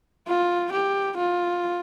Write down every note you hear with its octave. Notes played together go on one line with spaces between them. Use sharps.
F4
G4
F4